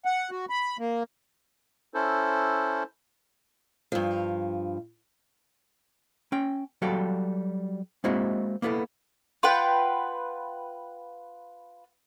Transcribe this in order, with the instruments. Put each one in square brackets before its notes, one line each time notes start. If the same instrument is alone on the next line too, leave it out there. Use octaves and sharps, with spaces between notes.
[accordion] F#5
F#4
B5
A#3
[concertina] C#4 E4 A4 C5
[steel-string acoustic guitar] G2 F3
[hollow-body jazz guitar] C#4 G5
F#3 G3 F#4 A4 F5 G5
G#3 A#3 C4 E4 F#4 D#5
A#3 B3 E4 G#4 A4
[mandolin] F4 B4 F#5 G5